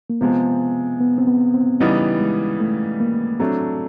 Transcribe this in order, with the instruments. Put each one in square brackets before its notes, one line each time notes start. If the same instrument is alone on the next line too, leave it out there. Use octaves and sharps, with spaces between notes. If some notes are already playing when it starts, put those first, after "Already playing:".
[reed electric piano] A#3
[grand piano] C3 F3 G#3 [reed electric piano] B3
[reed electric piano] B3
C4
B3
C4
[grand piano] C#3 E3 G3 B3 D#4 [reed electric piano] C#4
[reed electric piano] G#3
A3
A#3
[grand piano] F#3 A3 D4 [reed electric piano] C4